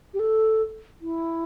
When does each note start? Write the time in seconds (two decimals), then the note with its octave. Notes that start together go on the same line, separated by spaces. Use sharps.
0.14 G4
0.19 A4
1.01 E4